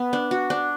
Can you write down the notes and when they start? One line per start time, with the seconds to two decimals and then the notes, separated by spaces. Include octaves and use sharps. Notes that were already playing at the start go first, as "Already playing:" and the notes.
Already playing: B3
0.13 D4
0.31 F#4
0.50 D4